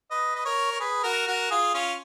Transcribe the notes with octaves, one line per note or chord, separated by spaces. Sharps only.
B4 D#5
D#5
A#4 C#5
C#5
G#4 B4
F#4 A#4
F#4 A#4
F4 G#4
C#4 F4